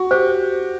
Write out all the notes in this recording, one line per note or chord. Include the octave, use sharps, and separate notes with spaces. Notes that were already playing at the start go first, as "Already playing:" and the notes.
Already playing: F#4 C#6
G4 C5